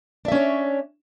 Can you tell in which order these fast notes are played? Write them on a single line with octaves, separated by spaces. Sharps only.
D4 E5 C#4 C#5